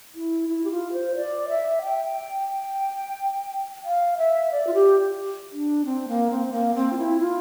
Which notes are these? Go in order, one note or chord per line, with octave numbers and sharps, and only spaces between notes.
E4
E4
G4
F4
C5
D5
E5
G5
F5
E5
D5
F4
G4
D4
C4
A#3
C4
A#3
C4
F4
E4
F4